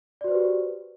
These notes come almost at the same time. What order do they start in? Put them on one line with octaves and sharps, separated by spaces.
D5 F#4 C5 B4 G4